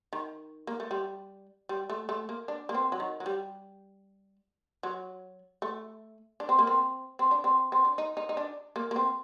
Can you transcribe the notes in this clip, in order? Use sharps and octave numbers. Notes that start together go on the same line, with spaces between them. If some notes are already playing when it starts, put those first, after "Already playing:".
D#3
A#3
A3
G3
G3
A3
A3
A#3
D4
A#3
C4
F#3
D#3
F#3
G3
F#3
A3
D4
C4
A#3
C4
C4
D4
C4
C4
D4
D#4
D#4
D#4
D4
A#3
A#3
C4